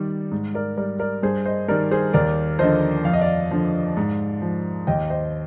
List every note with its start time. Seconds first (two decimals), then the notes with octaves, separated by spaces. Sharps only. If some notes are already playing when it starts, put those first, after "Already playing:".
Already playing: D#3 G3 D5
0.31 G#2
0.54 A#4 D5
0.77 G3 A#4 D5
1.00 A#4 D5
1.23 G2 G#4 C5
1.45 C5 D#5
1.68 D#3 G3 A#4 D5
1.91 G#4 C5
2.13 D#2 A#4 D5
2.59 D3 F3 C5 D#5
3.05 F2 F5
3.13 D#5
3.21 D5 F5
3.51 D3 F3
3.97 G#2
4.42 F3
4.87 D#2 D#5 G5
5.10 C5 D#5